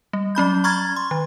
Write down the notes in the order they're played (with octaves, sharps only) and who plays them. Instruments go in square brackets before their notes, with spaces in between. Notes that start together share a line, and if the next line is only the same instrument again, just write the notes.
[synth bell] G3
F#3 C#4 B5 G6
A#5 B5 C#6 F6 G#6 A6
C6
D#3